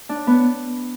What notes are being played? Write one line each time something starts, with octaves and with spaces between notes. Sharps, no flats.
D4
B3